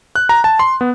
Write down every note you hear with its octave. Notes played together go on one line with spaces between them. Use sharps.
F#6
A#5
A5
C6
B3